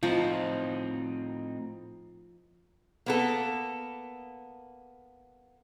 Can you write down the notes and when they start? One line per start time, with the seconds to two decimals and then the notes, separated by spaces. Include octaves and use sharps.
0.03 A2 F3 C4 D#4
3.06 A#3 B3 A4